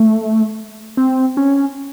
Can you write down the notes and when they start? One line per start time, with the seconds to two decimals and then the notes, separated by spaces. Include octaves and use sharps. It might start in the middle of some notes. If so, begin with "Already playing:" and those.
Already playing: A3
0.97 C4
1.37 C#4